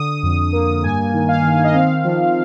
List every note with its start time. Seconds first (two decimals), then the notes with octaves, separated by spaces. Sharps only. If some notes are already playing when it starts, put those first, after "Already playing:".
Already playing: D3 D#6
0.23 F2
0.53 A#3
0.84 G2 G#5
1.14 D#3
1.29 F5
1.44 D#3
1.64 D#5
1.73 C4 F5
2.04 F3